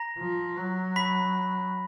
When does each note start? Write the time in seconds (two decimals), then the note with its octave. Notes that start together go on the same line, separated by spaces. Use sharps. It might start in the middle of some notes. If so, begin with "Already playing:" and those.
Already playing: A#5 A#6
0.19 F3
0.57 F#3
0.96 B5 B6